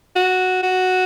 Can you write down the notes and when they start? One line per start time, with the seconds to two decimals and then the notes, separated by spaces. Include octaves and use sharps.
0.16 F#4
0.63 F#4